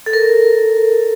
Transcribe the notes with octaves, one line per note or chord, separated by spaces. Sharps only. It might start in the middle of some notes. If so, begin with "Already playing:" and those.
A4
A#4